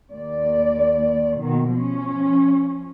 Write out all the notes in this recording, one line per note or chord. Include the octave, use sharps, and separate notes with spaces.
D#2 D5
B2 D#3 A#3
F3 C#4